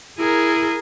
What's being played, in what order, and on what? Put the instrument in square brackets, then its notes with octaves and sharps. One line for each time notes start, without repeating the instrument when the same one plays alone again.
[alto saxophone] E4 [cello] G#4 A#4